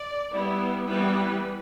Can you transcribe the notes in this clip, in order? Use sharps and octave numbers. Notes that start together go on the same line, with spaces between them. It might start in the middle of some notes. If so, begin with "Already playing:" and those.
Already playing: D5
G3 B3 E4
E3 G3 B3 E4 B4